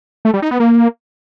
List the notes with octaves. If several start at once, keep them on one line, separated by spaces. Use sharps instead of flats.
A3
G3
D#4
B3
A#3